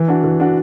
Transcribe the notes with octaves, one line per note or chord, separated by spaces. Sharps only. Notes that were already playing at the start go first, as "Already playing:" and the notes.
Already playing: E3
D4 F#4
E3
D4 F#4